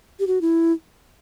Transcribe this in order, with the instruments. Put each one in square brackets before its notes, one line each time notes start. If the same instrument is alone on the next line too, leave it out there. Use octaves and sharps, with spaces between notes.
[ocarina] G4
F#4
E4